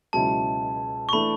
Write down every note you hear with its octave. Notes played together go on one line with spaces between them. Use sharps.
C#2 B2 F#3 C#4 E4 A5
C#6
E3 A3 D4 A4 B5